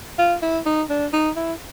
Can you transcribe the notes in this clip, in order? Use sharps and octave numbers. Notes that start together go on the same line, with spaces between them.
F4
E4
D#4
D4
D#4
E4